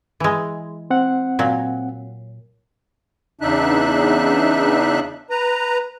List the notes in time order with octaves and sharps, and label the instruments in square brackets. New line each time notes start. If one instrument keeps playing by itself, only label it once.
[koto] E3 G#3
[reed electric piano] C4 F#5
[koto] A#2 F#3
[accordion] E2 C#3 D4 D#4 E5 F#6
B4 A#5